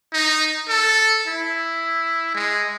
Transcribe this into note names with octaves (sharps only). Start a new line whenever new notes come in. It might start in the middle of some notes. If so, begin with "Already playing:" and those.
D#4
A4
E4
G#3